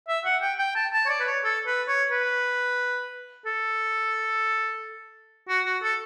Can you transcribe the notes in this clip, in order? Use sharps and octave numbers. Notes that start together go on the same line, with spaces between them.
E5
F#5
G5
G5
A5
A5
C#5
D5
B4
C#5
A4
B4
C#5
B4
A4
F#4
F#4
A4